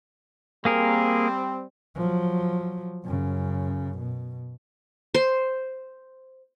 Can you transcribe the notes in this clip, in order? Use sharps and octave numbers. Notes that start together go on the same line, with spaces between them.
G3 A#3 C4 G#4 A#4
F3 F#3
F#2 C#3
B2
C5